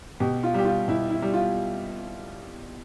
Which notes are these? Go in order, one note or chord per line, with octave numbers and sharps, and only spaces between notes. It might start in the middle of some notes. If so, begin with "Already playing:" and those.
B2 G4
F4
G3 G4
F4
B2 E4
E4
G3
F4